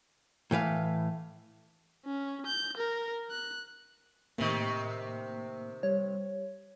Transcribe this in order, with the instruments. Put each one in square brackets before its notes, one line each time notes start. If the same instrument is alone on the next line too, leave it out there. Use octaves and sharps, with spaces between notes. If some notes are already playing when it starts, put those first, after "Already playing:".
[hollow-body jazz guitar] A2 E3 B4 F5
[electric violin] C#4
G6
A#4
F#6
[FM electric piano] A2 A#3 [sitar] C3 D#3
[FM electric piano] G3 [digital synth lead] C#5